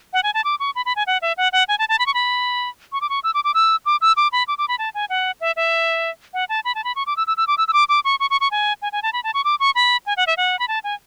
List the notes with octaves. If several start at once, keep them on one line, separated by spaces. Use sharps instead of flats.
F#5
G#5
A5
D6
C#6
B5
B5
G#5
F#5
E5
F#5
F#5
G#5
A5
A5
B5
C#6
B5
C#6
D6
C#6
E6
D6
D6
E6
D6
E6
D6
B5
D6
D6
B5
A5
G#5
F#5
E5
E5
F#5
A5
B5
A5
B5
C#6
D6
E6
E6
E6
D6
E6
E6
D6
D6
C#6
C#6
C#6
C#6
G#5
G#5
G#5
A5
B5
A5
C#6
D6
C#6
B5
G#5
F#5
E5
F#5
B5
A5
G#5